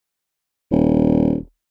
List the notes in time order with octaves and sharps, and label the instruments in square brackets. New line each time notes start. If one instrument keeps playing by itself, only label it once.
[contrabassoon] D#1